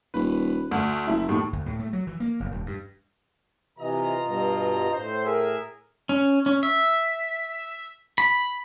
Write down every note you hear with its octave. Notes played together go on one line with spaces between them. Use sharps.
D#1 B4
D2
F#1 E4
D#2 A2
D2
A2
A3
F#3
E3
A#3
F#1
D#1
G2
C3 E3 F4 D#5 A#5
G2 B2
A2 C5
G#4 A#4 E5
C#4
C#4
E5
B5